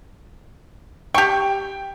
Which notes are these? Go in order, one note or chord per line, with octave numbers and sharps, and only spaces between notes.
G4 G5 C#6